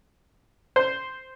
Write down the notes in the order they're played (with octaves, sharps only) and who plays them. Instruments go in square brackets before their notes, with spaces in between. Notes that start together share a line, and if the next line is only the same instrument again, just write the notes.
[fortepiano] C5